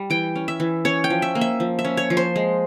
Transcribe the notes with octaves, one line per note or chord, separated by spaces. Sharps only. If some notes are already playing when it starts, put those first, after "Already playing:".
Already playing: G3
E3 G5
C#4
E5
E3
C#4 C#5
G5
F3
E5
A#3
E5
F3
E5
C#4
C#5
F3
C5
G#3